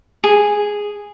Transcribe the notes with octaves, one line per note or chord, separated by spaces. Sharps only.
G#4